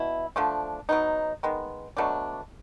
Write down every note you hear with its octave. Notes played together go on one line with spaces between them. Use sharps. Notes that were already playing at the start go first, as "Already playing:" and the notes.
Already playing: B2 E4
D3 F3 A3 D4
F#3 B3 D#4
D#3 G#3 B3
B2 F#3 A3 D4